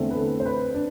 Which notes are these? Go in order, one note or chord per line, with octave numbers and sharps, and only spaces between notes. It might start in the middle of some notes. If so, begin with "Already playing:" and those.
Already playing: E2 D3 A3 C4
B4
A4
C5
B4
D4